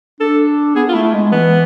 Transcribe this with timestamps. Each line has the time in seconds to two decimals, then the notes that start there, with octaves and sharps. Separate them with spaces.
0.20 D4 A4
0.76 B3 G#4
0.89 F4
0.94 A3 E4
1.14 G#3
1.32 E3 B3